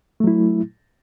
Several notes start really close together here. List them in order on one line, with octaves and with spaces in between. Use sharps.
A3 F#3 E4